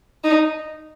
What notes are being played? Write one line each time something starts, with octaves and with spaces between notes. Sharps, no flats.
D#4